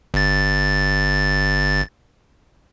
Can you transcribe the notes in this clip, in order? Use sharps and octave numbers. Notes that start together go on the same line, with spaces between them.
G1 A6